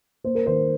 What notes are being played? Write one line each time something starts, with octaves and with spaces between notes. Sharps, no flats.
A#3 C5
A#4
D#3 C5